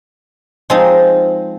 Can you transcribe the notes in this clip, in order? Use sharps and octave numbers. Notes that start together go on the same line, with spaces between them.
F3 G#3 C4 D#4